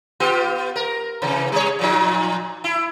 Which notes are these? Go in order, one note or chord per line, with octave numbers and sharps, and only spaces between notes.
B3 F4 G4
A#4
C3 E3
G3 C#5
A#2 F3 D#4
E4